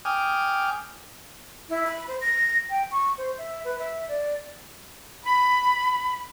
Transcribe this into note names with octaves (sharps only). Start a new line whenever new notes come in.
G5 G#5 D6 D#6 F6
E4
B5
C5
A#6
G5
C#6
C5
E5
B4
E5
D5
B5